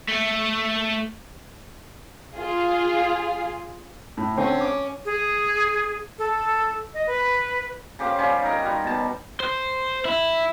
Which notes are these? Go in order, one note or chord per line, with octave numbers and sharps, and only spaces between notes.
A3
F4 G#4
A2
D3 C4 C#4
D6
G#4
A4
D#5
B4
C#3 G4 C5 F5
G3 C#4 F4 G4
D#4 A#4
G3 F#4
B2 A5
C5
E4